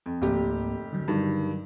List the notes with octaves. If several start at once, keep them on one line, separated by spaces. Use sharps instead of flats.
F2
F1 C#2 G#2 A#3 G4
D3 F#3
G2 D#3